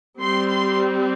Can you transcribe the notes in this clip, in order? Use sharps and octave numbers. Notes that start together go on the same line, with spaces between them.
G3 C4 C6
C6